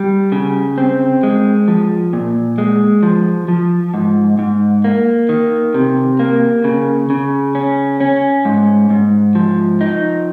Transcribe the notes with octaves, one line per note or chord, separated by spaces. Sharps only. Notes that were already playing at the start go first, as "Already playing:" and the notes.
Already playing: G3
C#3
C4
G#3
F3
A#2
G#3
F3
F3
G#2
G#2
A#3
D#3
C3
A#3
C#3
C#3
C#4
C#4
G#2
G#2
F3
D#4